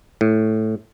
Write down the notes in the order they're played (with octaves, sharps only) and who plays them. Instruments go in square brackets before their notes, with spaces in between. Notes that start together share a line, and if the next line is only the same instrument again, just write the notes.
[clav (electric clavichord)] A2